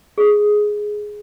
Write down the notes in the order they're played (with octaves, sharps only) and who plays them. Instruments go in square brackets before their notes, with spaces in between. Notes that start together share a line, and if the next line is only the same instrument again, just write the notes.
[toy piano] G#4